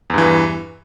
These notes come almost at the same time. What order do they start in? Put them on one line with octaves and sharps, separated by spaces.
E2 G2 E3